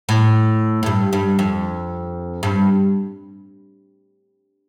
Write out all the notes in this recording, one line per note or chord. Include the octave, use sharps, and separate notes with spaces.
A2
A2
G2
G2
F2
G2